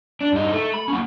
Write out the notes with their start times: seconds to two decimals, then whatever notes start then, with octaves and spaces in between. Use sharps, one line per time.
0.21 D4
0.32 G2 D#4
0.52 A3
0.74 B5
0.88 A#3 C#4